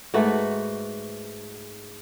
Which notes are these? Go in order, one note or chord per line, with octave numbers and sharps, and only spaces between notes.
G#2 A3 F#4 B4